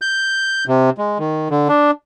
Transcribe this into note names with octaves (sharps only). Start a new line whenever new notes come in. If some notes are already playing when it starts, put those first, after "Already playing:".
G6
C3
G#3
D#3
D3
D4